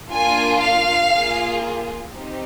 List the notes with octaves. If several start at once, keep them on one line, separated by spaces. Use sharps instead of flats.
A#3 D4 F4 G#5
F5
A#3 F4 G#4
C4 D#4 G4